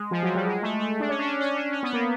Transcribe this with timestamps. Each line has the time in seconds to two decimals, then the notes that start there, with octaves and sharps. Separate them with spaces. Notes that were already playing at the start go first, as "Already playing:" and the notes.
Already playing: G#3
0.11 F3
0.23 F#3
0.35 G3
0.47 G#3
0.62 A3
0.78 A3
1.00 D4
1.09 C#4
1.19 D4
1.25 C#4
1.41 C#4
1.56 D4
1.72 C#4
1.83 B3
1.93 A#3